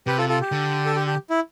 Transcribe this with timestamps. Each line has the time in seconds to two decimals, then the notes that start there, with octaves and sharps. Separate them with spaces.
0.07 C3 G4 B4
0.18 F4 A4
0.29 F4 A4
0.41 G4
0.52 D3
0.85 A4
0.96 G4
1.07 G4
1.30 E4